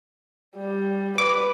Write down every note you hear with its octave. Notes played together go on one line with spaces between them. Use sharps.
G3
B4 D6